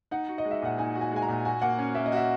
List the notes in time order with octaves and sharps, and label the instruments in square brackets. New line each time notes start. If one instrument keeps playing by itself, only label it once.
[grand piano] D#4 [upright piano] F#5
[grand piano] F#4
[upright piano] D#5
[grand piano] G#3
[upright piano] E5
[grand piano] A#2 [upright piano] F#5
[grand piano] D#4 [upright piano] G#5
[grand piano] F#4
[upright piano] G#5
[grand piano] G#3 [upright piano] G#5
[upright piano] A#5
[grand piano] A#2
[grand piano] F#4 [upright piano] G#5
[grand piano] A#3 [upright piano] F#5
[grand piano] C#4
[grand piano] A#3 [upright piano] E5
[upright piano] D#5
[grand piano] F#4 [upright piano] E5